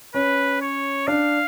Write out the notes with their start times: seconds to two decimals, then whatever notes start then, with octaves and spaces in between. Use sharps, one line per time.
0.14 C#4 B4
0.61 C#5
1.07 D4 F5